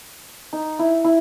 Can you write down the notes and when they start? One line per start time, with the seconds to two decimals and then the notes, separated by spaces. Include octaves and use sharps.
0.53 D#4
0.79 E4
1.04 E4